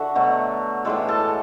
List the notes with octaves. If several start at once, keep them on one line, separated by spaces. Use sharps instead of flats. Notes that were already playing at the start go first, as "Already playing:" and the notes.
Already playing: D3 F#4 A4 E5 F#5
B2 F#3 A3
A2 E3 G#3 A4 A5
A4 A5